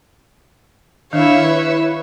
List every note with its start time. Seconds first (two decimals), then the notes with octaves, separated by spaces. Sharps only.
1.13 D#3 D4 E4 C#5 E5 F5
1.44 E4 B4